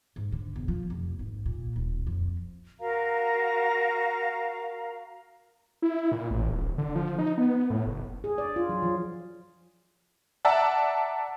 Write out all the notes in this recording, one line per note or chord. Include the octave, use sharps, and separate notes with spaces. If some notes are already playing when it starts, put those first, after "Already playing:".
G#2
D3
E1
F3
F1
G#1
A#2
D#1
F2
F#4 A#4 F5 A#5
E4
A#2
A1
D#1
D3
F3
D#4
B3
A2
F#1
G#4
D5
F4
F#3
F3
D5 E5 F#5 A5 A#5